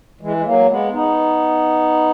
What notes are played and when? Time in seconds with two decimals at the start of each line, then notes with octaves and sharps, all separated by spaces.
0.21 E3 G#3
0.36 G#3
0.45 F#3 A#3
0.69 G#3 B3
0.93 B3 D#4